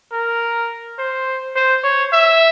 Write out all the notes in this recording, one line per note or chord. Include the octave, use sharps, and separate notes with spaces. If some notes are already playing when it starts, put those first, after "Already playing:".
A#4
C5
C5
C#5
E5